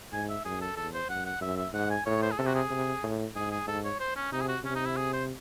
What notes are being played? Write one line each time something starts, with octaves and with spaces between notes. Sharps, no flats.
G#2 G#5
E5
F#2 G#4
A4
E2 A4
C5
F#2 F#5
F#5
F#2 E5
E5
G#2 F#5
G#5
A2 C#5
C5
G#4
C3 A4
F#4
G#4
C3
A2
G#2 G#4
G#4
G#2 A4
C#5
C5
C#4
C3 D#4
G#4
F#4
C3 C#4
D#4
E4
G#4
C5